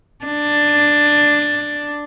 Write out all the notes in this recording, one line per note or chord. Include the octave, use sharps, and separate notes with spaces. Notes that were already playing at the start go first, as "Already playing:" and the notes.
D4